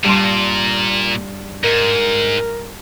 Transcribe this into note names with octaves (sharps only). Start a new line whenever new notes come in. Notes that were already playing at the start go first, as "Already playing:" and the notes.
G2 A#2 C6
G#2 A#4